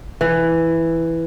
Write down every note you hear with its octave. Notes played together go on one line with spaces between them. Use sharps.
E3